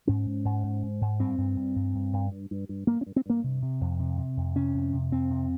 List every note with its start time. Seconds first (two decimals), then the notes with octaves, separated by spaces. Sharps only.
0.07 G#2 C#4
0.26 G#2
0.45 G#2
0.63 G#2
0.83 G#2
1.01 G#2
1.19 G2 C4
1.38 G2
1.57 G2
1.76 G2
1.94 G2
2.13 G2
2.32 G2
2.51 G2
2.69 G2
2.87 G2 A#3
3.01 C#4
3.06 G2
3.16 C4
3.26 G2 A#3
3.44 C3
3.62 C3
3.81 F2
3.99 C3
4.18 C3
4.37 F2
4.55 C3 C#4
4.74 F2
4.93 C3
5.12 F2 C4
5.31 C3